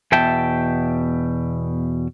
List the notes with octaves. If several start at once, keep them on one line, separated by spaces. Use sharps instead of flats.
E2 B2 E5 G5 A5